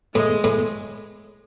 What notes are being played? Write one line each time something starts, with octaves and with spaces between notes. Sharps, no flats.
A2 G#3
A2